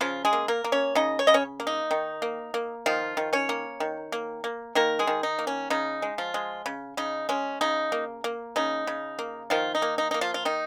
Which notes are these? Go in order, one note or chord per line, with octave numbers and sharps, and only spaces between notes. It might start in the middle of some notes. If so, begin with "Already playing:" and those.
C#3 F3 F4
G#3 G#4
A#3
A#3 A#4
A#3
C#4 C#5
C#3 D#4 D#5
C#5
C#3 D#5
C#4 C#5
A#3
D#4
D#3
A#3
A#3
D#3 F3 F4
D#3
C#4 C#5
A#3
D#3
A#3
A#3
D#3 A#3 A#4
G#3 G#4
D#3
D#4
A#3
C#4
C#3 D#4
G#3
F3 F4
G#3
C#3
C#3 D#4
G#3 C#4
C#3 D#4
A#3
A#3
C#3 D#4
C#3
A#3
D#3 F3 F4
D#4
A#3
D#4
A#3 D#4
F3 F4
F4
D#3 D#4